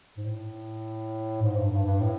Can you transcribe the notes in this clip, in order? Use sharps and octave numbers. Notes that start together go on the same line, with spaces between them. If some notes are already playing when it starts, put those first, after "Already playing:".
G#2
A2
G#2
G2
G2
G2
A2